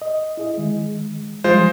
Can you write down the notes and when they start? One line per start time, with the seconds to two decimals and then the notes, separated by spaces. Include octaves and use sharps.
0.02 D#5
0.37 E4 G#4 D#5
0.58 D#3 G#3
1.44 E3 F3 G3 G#3 F4 C5